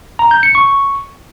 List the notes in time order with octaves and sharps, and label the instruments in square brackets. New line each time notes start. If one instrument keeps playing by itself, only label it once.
[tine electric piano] A#5
G6
C#7
C#6